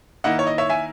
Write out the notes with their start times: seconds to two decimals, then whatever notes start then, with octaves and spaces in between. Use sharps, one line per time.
0.24 D#3 A#3 E4 D#5 F#5
0.39 C#5
0.47 D#5
0.58 C#5 E5
0.69 E5 G#5